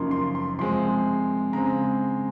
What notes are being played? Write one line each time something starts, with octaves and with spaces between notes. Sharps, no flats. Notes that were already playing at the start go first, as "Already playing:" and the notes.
Already playing: F#2 C#3 F3 A#3 D#4 C6
C6
C6
C3 F3 G#3 C4 C6
C#3 G#3 C4 A#5